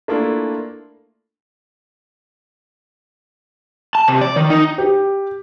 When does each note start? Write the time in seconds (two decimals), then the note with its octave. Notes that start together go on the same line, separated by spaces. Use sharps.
0.08 A3 A#3 D4 E4 F4
3.95 A5
4.08 C3
4.21 D5
4.36 D#3
4.50 D#4
4.78 G4